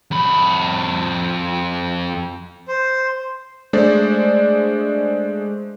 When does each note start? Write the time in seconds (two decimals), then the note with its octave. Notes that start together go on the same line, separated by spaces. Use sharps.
0.11 F2 B5
2.68 C5
3.73 G#3 A3 D4 C5 D5